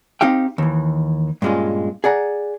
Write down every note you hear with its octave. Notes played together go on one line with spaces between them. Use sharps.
C4 D#4 G4 F5 G5
D#2 E3
G2 A#2 G#3 C#4 F4
G#4 D5 F#5 A#5